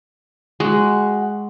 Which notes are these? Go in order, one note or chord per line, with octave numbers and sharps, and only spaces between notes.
G#3 F#4